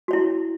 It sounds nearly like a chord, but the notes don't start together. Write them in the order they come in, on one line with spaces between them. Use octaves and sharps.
F#4 C#5 E4